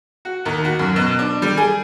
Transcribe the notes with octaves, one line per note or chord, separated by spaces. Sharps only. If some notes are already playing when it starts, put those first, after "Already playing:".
F#4
D#2
F#4
F#2
B2
D4
G3
G#4